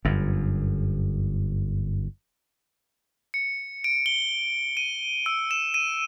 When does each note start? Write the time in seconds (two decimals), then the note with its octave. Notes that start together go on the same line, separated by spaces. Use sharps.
0.05 G1 F#2
3.34 C#7
3.84 D7
4.06 G7
4.77 D#7
5.26 E6
5.51 E7
5.74 D#7